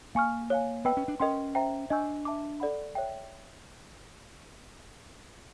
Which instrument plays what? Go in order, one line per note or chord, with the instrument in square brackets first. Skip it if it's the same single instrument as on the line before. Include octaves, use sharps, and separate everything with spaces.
[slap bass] A#3 [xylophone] F5 G#5 C#6 F6
[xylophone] C#5 F5 G#5
[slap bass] B3 [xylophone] B4 D#5 G5 B5 E6
[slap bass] C#4
D4
[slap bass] C#4 [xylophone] A#4 D#5 G5 C6
[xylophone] C5 E5 G5 A#5
[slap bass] D4 [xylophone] D#5 G#5 C#6 E6 G6
[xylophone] E5 A5 D6
A4 D5 F#5 B5
C#5 E5 G5